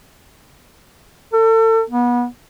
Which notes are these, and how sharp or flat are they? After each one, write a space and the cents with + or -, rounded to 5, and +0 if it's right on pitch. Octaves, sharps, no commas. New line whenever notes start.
A4 +35
B3 -30